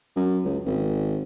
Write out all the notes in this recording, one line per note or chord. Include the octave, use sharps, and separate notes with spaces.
F#2
C#2
G#1